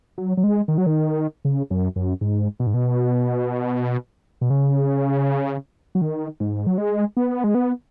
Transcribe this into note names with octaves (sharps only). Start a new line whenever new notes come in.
F#3
F#3
G#3
D#3
F#3
D#3
C#3
F#2
F#2
G#2
B2
G#2
B2
B2
C#3
F#3
D#3
G#2
F#3
G#3
B3
G#3
B3